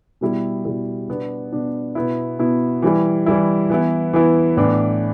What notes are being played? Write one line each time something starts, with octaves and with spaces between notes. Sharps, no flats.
B2 G3 E4
B2 G3 E4
B2 B3 D4
B2 B3 D4
B2 B3 E4
B2 B3 E4
E3 G3 E4
E3 G3 E4
E3 B3 E4
E3 B3 E4
A2 E3 B3 D4